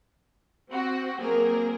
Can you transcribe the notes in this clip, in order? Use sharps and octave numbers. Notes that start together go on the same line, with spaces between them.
C4 F#4
F#3 A#3 C4 G#4 A#4